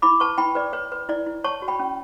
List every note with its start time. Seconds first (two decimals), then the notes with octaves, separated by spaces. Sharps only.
0.02 E4 B5 D6
0.20 B4 A5 C#6
0.38 E4 G5 B5
0.55 B4 D5
0.73 B4 C#5
0.92 B4
1.09 E4 D5
1.26 E4
1.44 C#5 A5 C#6
1.62 F#4
1.68 G5 B5
1.79 C#4